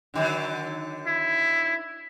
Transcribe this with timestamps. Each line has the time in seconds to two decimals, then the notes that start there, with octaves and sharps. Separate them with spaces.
0.14 D3 D#3 F#3
1.07 E4